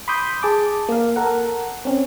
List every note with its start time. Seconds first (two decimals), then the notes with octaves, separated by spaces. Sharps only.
0.08 B5 C6 D6 D#6 G6
0.43 G#4 A5 D6
0.89 A#3 F5
1.16 A4 A#4 F#5
1.85 C4 C#4